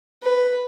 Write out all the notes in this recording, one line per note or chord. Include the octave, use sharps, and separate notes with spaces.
B4